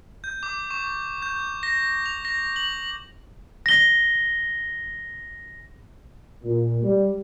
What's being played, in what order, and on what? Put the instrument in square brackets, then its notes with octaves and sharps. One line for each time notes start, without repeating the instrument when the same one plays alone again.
[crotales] G6
D6
C#6
G6
A#6
F7
A#6
F#7
[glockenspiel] A#6 G7
[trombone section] A#2
G3